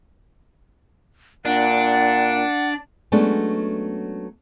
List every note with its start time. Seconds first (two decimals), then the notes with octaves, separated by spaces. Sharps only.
1.45 A#2 D4 F#5
3.12 F#3 G#3 A3 B3 C#4 D4